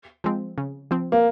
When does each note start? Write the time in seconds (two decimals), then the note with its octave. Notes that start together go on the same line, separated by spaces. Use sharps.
0.24 F3 G#3 C4
0.58 C#3
0.91 F3 C4
1.12 A#3